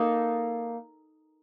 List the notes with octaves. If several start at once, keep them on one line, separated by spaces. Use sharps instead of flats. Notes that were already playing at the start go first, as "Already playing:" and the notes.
Already playing: A#3 D#4 A4